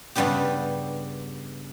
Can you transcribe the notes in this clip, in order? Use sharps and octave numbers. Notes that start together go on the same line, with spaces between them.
G2 C#3 G3 B3 D4 G4